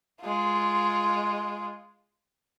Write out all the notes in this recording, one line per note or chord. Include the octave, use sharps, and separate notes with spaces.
G#3 F4